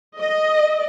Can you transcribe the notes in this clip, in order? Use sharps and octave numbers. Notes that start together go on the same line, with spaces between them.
D#5